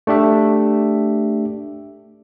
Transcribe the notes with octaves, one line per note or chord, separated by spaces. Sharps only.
A3 D4 G4 E5